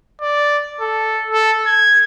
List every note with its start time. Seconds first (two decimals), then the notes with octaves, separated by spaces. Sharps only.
0.21 D5
0.81 A4
1.31 A4
1.66 G#6